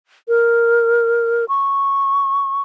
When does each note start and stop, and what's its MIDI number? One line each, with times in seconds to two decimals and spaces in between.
0.28 1.45 70
1.49 2.62 85